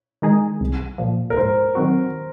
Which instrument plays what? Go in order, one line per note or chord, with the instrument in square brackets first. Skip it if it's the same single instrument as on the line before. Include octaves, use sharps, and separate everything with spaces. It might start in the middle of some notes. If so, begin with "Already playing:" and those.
[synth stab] D#3 G#3 D#4 G#4
C2
A#2 F3
[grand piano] A#4
[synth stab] G#2 [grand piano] C5
[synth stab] D#3 F#3 C4 F#4